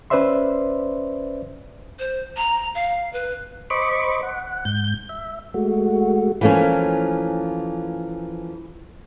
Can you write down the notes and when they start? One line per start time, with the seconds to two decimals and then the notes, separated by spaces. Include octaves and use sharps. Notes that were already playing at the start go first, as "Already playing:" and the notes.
0.10 C#4 B4 C5 D5 E5 C6
1.99 C5
2.37 A#5
2.75 F5
3.13 B4
3.70 C5 D#5 B5 C#6 D6
4.23 F#5
4.65 G#2 G6
5.09 E5
5.54 G#3 A3 F#4
6.41 E3 F3 A3 A#3 C#4